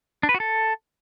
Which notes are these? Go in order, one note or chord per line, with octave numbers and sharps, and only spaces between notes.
D4
B4
F#4
A4